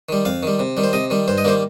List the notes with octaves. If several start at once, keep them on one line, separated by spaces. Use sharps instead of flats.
D#3 G3
F2 F5
D#3 G3
C3
D#3 G3
C5
C3 D#5
D#3 G3
G2 C5
D#5
D#3 G3 A#3 C5